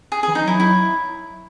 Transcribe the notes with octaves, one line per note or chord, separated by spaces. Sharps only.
G#4
G#4
E3
D#4
F#3 E4
E4